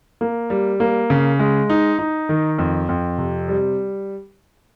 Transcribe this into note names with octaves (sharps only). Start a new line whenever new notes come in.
A#3
G3
A#3
C#3
G#3
D#4
D#4
D#3
F2
F2
C3
G3